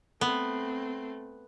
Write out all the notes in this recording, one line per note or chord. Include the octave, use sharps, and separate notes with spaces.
A3 B3 C4